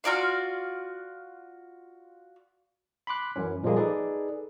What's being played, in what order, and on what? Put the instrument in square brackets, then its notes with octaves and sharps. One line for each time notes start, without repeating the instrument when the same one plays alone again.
[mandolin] F4 F#4 D5 F5
[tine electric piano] B5 C6 D6 F#6
F#2 E3 C#4
A#2 F3 G3 G#3 A#3 G#4
D#4 G#4 A4 B4 D5